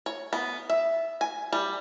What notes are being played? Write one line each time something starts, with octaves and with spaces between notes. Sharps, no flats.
C#5
B3
E5
G#5
G3